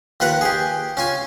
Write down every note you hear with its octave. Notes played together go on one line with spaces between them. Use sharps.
D#2 F4 B4 F#5 A#5
G4 G#4
C#4 F4 G#5